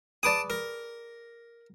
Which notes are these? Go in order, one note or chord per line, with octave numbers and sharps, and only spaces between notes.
G#4 B4 D5 A5 D6 D#6
A#4